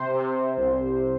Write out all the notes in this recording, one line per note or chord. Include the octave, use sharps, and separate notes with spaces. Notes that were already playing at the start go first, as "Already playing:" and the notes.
Already playing: C3 C5
C3
C2